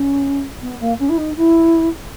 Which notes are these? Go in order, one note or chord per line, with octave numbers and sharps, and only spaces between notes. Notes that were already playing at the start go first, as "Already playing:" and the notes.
Already playing: C#4
B3
A#3
C#4
E4
D#4
E4